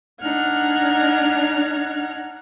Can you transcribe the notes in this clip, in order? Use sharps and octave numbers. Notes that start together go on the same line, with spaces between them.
D4 D#4 F#5 F6 G#6